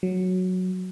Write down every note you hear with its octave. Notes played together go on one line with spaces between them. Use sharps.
F#3